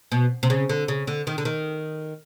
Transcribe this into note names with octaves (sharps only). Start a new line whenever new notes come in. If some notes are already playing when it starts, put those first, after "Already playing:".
B2
C3
C#3
D3
C#3
D3
D#3
D3
D#3